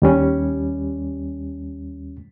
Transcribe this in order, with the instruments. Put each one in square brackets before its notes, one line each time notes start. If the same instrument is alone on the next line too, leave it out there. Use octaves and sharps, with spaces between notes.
[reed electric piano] D#2 G3 C#4